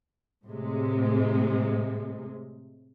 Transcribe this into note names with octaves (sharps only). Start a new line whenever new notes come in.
A2 C3 G#3